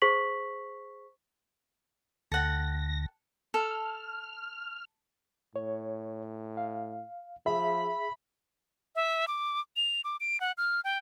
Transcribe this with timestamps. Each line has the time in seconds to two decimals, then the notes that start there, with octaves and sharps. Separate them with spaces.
0.02 G#4 C5 C#6 B6 F#7
2.32 D2 A4 F#5 G5 A#6
3.54 A4 F6
5.56 A2 C#5
6.57 F5
7.46 F3 G#4 E5 B5
8.95 E5
9.27 D6
9.76 F7
10.04 D6
10.20 D7
10.40 F#5
10.58 F6
10.84 G5